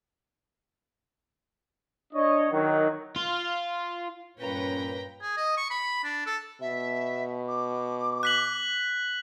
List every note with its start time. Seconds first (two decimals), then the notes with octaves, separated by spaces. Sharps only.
2.13 D4 C#5 D#5
2.52 D#3 F#3
3.16 F4
4.39 G2 A#2 C#4 B4 C#5 G5 A#5
5.22 G#4
5.37 D#5
5.57 C#6
5.70 B5
6.04 D4
6.26 A4
6.61 B2 E5
7.48 D6
8.23 F#6 B6 F#7